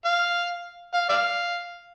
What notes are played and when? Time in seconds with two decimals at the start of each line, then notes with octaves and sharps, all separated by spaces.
0.05 F5
0.94 F5
1.09 D5 F5